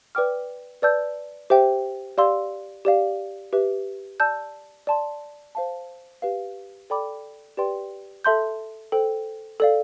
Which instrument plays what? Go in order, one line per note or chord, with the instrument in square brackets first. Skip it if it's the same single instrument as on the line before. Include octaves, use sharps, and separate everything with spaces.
[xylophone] B4 D5 G5 D6 F6
B4 D5 A5 E6 G6
G4 C5 E5 G5
G4 D5 F5 C6 E6
G4 D5 F5
G4 B4 E5
D5 A5 E6 G6
D5 A5 C6
C5 F5 A5
G4 B4 F5
A4 D5 G5 B5 D6
G4 B4 D5 G5 C6
A4 E5 A5 C6 G6
A4 C5 G5
A4 D5 F5